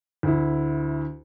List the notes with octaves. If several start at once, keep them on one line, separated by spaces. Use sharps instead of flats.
D2 E4